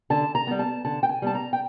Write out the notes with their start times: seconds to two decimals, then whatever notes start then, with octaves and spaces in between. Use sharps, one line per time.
0.10 D3 A5
0.35 A#5
0.47 G3 B3
0.59 A5
0.85 D3 A5
1.03 G5
1.09 G#5
1.22 G3 B3 A5
1.35 A#5
1.53 G5